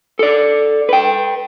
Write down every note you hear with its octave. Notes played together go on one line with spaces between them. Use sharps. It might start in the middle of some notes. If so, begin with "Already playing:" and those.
A4 D5
B4 G5